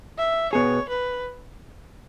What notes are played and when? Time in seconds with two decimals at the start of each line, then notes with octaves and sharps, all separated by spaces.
0.18 E5
0.53 B2 B3 G#4 C#5
0.89 B4